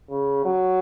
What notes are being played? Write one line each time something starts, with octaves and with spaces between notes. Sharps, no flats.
C#3
F#3